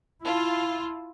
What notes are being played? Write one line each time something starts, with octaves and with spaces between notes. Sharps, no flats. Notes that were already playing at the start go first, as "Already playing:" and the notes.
E4 F4 A5